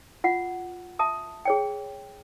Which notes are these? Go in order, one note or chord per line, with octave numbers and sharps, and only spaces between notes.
F4 F#5
E5 A5 D#6
G#4 C#5 G5